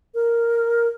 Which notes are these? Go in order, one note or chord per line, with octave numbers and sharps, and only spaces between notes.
A#4